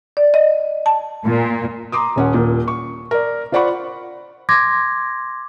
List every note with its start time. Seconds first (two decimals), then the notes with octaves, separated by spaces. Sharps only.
0.17 D5
0.34 D#5
0.86 A5
1.26 A#2
1.92 A#5 C6 D6 D#6
2.16 D#1 C#4 F#5
2.34 D#1 A#2
2.68 C#6
3.11 A#4 D5
3.52 F4 C5 D5 F#5 B5 C#6
4.49 C6 D6 G#6 A#6